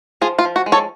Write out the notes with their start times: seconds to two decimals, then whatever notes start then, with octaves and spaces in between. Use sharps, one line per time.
0.21 F3 F4 G#4
0.39 F4
0.45 F3
0.56 F#4
0.66 G#3
0.72 A4 C#5